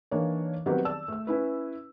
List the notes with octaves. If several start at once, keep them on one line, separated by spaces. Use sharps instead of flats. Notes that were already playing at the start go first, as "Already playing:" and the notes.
E3 A#3 D4 D#4 C#5
D#3 F#3 G3 B3 C4 G4
D5 A5 E6
A3 E6
C#4 E4 B4